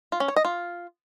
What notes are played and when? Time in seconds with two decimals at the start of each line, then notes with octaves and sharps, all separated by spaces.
0.12 F4
0.20 C#4
0.28 C#5
0.36 D#5
0.45 F4